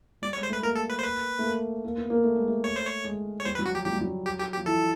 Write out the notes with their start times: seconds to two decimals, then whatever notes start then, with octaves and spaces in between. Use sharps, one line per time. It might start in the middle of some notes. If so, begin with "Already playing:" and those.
0.22 G3 D5
0.33 C#5
0.36 G#3
0.43 C5
0.49 A3 B4
0.62 A#3 A#4
0.76 A4
0.90 B4
0.99 C5
1.03 B4
1.38 A3
1.43 A#3
1.84 A#3
1.97 B3
2.10 A#3
2.24 A3
2.36 G#3
2.48 A3
2.64 C#5
2.76 C5
2.87 C#5
3.04 G#3
3.40 C#5
3.45 G3 C5
3.55 B4
3.59 F#3
3.65 F#4
3.72 F3 G4
3.85 F#3 G4
3.93 G3
4.01 F#3
4.26 G4
4.39 G4
4.53 G4
4.57 F3
4.66 E3 A4